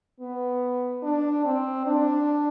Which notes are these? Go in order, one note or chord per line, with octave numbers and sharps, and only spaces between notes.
B3
D4
C4
D4